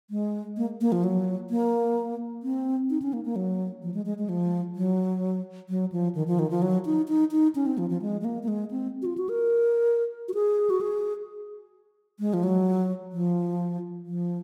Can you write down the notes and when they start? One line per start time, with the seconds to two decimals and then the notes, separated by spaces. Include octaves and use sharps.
0.10 G#3
0.57 A#3
0.81 A#3
0.92 F3
1.04 F#3
1.50 A#3
2.43 C4
2.90 D#4
3.02 C#4
3.13 A#3
3.25 A#3
3.36 F#3
3.82 F3
3.94 G#3
4.06 G#3
4.18 G#3
4.29 F3
4.76 F#3
5.69 F#3
5.92 F3
6.15 D#3
6.28 F3
6.39 D#3
6.50 F3
6.62 F#3
6.85 D#4
7.08 D#4
7.32 D#4
7.55 C#4
7.66 C4
7.78 F3
7.90 F3
8.02 G#3
8.21 G#3
8.25 A#3
8.43 A#3
8.48 G#3
8.71 C4
9.02 F#4
9.06 F4
9.18 F#4
9.29 A#4
10.28 F#4
10.34 G#4
10.70 F#4
10.81 G#4
12.20 G#3
12.34 F3
12.43 F#3
13.12 F3
14.06 F3